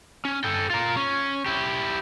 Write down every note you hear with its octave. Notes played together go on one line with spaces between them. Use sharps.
C#4
A4 G5
F4 A#4
C#4
E4 G4